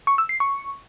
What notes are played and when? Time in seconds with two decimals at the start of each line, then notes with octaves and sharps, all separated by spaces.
0.07 C#6
0.18 E6
0.29 C7
0.40 C#6